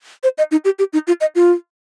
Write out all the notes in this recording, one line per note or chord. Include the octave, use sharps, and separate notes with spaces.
C5
D#5
D#4
G4
G4
D#4
F4
D#5
F4